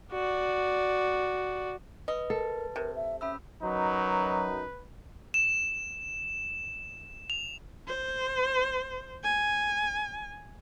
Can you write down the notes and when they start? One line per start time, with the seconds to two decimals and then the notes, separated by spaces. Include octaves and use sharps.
0.12 F#4 D5
2.08 B4 D#5
2.30 A4 A#4
2.76 C3 A#4
2.95 E5
3.21 C#4 E5 B5 E6
3.63 F#2 F#3 D#4 B4
5.34 E7
7.30 F7
7.88 C5
9.24 G#5